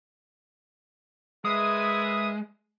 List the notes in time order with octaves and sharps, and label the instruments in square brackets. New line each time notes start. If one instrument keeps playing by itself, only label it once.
[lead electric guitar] G#3 [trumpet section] A#4 B4 E5 [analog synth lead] D#6